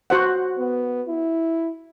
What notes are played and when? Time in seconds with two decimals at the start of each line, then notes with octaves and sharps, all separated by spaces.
0.10 F#4 C5 F#5
0.58 B3
1.08 E4